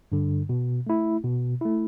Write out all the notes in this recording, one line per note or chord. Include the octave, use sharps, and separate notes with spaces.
G2 D3
B2
A3 E4
B2
A3 E4